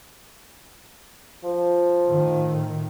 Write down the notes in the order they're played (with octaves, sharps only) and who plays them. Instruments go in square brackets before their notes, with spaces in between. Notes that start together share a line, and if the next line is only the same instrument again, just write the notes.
[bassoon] F3
[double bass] A2 D#3